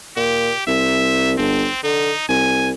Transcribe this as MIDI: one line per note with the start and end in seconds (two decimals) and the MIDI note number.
0.16 0.50 46
0.16 0.64 67
0.67 1.37 36
0.67 1.32 76
1.38 1.68 31
1.38 1.83 60
1.83 2.11 50
1.83 2.25 63
2.29 2.72 36
2.29 2.68 80